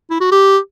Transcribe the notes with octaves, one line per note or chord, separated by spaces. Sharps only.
E4
F#4
G4